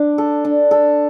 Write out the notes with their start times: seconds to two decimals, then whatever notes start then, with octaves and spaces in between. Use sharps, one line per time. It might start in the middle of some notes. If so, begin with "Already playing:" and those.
Already playing: D4
0.18 A4
0.45 D4
0.71 A4